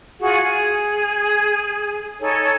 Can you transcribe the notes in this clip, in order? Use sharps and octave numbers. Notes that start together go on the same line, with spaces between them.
F4 F#4 G#4 F#5
G#4
D#4 A4 C#5 G#5